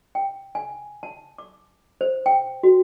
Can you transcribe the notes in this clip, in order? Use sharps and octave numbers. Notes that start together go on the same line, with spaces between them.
G5
G#5
A5
D6
C5
G5
F#4